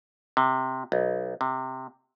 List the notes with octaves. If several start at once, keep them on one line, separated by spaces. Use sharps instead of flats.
C3
B1
C3